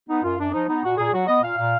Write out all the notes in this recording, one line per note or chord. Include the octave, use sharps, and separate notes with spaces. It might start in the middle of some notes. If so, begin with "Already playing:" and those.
B3 D#4
F#2 F4
F#2 D4
F3 D#4
B3 D#4
A#2 F#4
A#2 G#4
F#3 F#4
B3 D#5
A#2 F5
A#2 F5